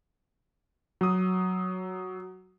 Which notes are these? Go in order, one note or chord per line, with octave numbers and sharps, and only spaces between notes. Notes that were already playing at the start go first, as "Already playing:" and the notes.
F#3 D#6